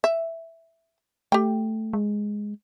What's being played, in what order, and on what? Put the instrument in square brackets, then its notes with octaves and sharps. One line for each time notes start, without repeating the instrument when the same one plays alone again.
[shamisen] E5
[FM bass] A3 [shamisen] G4 G5
[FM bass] G#3